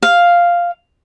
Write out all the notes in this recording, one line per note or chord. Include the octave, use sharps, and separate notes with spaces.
F5